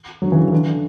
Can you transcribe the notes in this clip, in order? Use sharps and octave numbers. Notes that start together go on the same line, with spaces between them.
D3 F#3
C#3 E3
E3
D3
D3